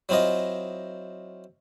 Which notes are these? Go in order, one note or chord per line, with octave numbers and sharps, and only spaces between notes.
F#3 C4 E4 F4 D#5